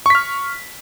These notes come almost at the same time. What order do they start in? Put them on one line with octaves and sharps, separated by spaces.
C#6 B6 F6